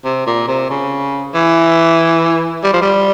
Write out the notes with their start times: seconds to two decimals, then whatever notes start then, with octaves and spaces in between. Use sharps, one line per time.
0.05 C3
0.26 A#2
0.48 C3
0.70 C#3
1.34 E3
2.64 G3
2.73 F3
2.82 G3